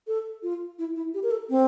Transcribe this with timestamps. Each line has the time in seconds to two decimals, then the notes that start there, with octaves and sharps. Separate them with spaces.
0.07 A4
0.43 F4
0.79 E4
0.96 E4
1.14 G4
1.23 A#4
1.31 A4
1.50 C4